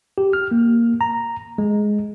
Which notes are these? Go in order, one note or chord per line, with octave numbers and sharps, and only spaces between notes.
G4
F6
A#3
A#5
G#3